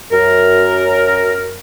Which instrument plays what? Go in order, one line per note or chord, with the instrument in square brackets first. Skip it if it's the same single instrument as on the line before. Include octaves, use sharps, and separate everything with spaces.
[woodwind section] F#2 A#4